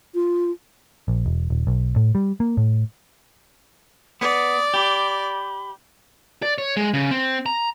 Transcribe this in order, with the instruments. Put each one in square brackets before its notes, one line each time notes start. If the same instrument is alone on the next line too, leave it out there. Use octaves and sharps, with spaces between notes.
[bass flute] F4
[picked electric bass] A#1
E1
D#1
B1
A2
G3
A#3
A2
[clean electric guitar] B3 [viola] D5 [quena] D#6
[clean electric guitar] G4 [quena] B5
[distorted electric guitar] D5
C#5
G#3
C#3
C4
A#5